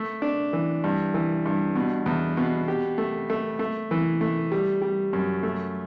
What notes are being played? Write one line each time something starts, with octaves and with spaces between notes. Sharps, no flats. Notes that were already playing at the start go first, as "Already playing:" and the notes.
Already playing: A3
D4
E3
G2
E3
G2
B2
E2
B2
G4
A3
A3
A3
E3
A3
G3
G3
F#2
A3